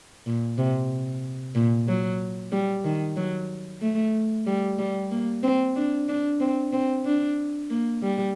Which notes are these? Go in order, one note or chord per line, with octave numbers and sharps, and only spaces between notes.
A#2
C3
A#2
F#3
G3
D#3
F#3
A3
G3
G3
A#3
C4
D4
D4
C4
C4
D4
A#3
G3